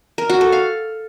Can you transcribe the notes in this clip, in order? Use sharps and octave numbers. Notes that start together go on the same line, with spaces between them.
A#4
F#4
A4
F5